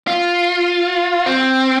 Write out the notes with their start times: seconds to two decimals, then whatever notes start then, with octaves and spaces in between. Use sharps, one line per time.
0.07 F4
1.26 C4